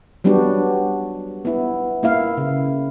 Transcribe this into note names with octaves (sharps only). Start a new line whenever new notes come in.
F#3 G3 B3 D4 F#4 G4
B3 E4
A#3 E4 F5
C#3